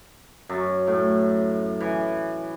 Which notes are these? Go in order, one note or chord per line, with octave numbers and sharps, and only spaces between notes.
F#2
A2
E3